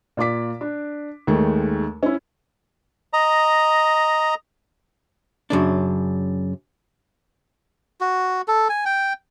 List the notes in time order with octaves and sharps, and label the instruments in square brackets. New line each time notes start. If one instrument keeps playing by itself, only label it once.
[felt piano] A#2 F4 D5 D6 B6
D4
D#2 D#3 G#3 A3
C#4 E4
[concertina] D#5 A#5
[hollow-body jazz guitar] F#2 C#3 D4
[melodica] F#4
A4
G#5
G5